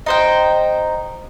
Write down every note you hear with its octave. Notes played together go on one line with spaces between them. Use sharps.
D#4 C5 G5